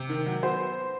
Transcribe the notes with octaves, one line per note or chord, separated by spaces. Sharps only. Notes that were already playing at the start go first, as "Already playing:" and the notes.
Already playing: C3
D#3
F#3
B3 C5